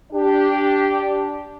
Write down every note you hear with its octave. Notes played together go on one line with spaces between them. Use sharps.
D4 G4